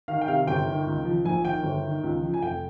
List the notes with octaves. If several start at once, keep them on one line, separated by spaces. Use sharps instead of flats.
D#3 F5
G5
C3 F5
G1 G5
D#3
C#2
F3
A#1 G#5
D#3 G5
G1
D#3
C#2
F3
G#5
F1 G5